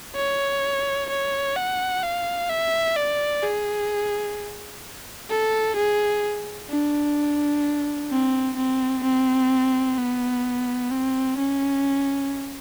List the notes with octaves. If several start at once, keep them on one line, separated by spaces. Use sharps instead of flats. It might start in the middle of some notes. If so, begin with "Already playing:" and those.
C#5
C#5
F#5
F5
E5
D5
G#4
A4
G#4
D4
C4
C4
C4
B3
C4
C#4